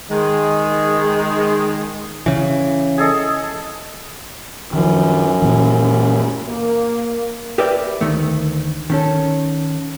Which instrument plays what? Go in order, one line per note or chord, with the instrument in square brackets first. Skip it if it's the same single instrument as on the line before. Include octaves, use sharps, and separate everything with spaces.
[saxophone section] D#3 G#3
[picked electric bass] C#3 E3
[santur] G#4 A4 D#5
[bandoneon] F#2 [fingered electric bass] D#3 F3
[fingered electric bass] A#2 E3
[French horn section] A#3
[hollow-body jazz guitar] G4 A#4 B4 D5 E5 G5
D2 G2 D#3 A3
D#3 C#4 A4